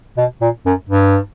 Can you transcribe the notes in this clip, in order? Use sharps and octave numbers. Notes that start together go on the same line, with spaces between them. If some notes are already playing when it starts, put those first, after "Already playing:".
B2
A#2
F#2
G2